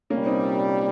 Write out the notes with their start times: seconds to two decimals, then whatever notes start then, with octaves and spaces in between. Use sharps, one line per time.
0.10 C2 A#2 G3 A#3 C#4
0.26 C4 D#4